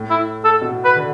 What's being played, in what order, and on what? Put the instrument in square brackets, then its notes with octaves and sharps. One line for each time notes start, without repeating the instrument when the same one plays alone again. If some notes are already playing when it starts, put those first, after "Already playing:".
Already playing: [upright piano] A2
[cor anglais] E4
A4
[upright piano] B2
[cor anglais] B4
[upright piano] D3